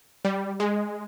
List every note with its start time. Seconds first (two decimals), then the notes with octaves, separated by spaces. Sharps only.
0.25 G3
0.60 G#3